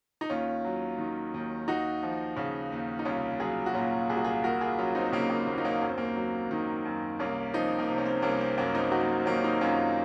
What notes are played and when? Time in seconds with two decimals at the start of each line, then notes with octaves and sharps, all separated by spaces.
0.21 D#4
0.30 D#2 C#4 F4
0.65 F#3
0.98 D#3
1.34 D#2
1.68 D#2 D#4 F#4
2.03 F3
2.37 C#3
2.72 D#2
2.99 D#4
3.05 C2 C#4 F4
3.40 F#3 F4 G#4
3.66 F#4
3.74 A#2 C#4 F4
4.10 C2 G#4
4.17 F#4
4.24 F4 G#4
4.43 D#2 F#4 A#4
4.61 F4 G#4
4.78 F#3 C#4 F4
4.95 C4 D#4
5.05 C4
5.12 C#3 A#3 C#4
5.30 A#3
5.47 D#2 C4
5.58 D#4
5.64 A#3 C#4
5.81 F#2 C#4
5.89 C4
5.98 A#3
6.04 C4
6.15 F#3
6.51 D#3
6.85 F#2
7.19 C2 A#3 C#4
7.53 F3 C4 D#4
7.79 A#3
7.89 C3 C4
7.98 C#4
8.05 C4
8.22 C2 A#3 C#4
8.41 C4
8.58 F#2 A#3 C#4
8.75 C4 D#4
8.91 F#3 D#4 F#4
9.01 A#3
9.09 C4
9.20 C4
9.26 D#3 A#3 C#4
9.39 C#4
9.44 C4 D#4
9.61 F#2 C#4 F4